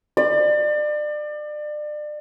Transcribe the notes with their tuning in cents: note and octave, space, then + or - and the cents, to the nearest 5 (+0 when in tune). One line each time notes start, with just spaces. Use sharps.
D5 +30